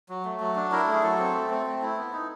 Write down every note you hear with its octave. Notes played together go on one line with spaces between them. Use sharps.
F#3
A3
F#3
D4
E4 A#4
A3 G#4
F#3 A4
C4
A3
C4
A3
E4
B3
D#4